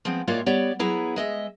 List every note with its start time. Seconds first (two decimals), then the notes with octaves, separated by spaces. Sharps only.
0.05 F3 G#3 B3 C4
0.27 A2 G#3 A#3 F4 C#5 D5
0.46 G3 B3 G4 C#5 D5
0.79 F#3 B3 E4 G#4 A#5
1.16 G#3 D#5 E5